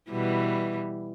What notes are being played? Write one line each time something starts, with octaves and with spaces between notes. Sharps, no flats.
B2 E3 G3